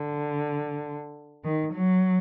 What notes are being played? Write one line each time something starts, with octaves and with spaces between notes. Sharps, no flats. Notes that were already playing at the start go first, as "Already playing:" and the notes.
Already playing: D3
D#3
F#3